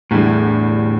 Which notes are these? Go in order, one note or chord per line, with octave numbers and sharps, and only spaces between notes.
E2 A2 D3 G3